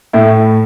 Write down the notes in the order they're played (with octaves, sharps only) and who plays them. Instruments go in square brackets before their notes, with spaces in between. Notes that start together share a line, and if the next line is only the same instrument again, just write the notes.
[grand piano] A2 E4